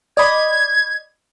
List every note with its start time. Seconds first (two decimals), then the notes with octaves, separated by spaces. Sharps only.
0.17 D5 D#5 B5 G#6